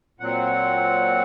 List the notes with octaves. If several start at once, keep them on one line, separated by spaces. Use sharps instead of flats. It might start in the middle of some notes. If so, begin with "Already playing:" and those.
A#2 F#3 C4 F#5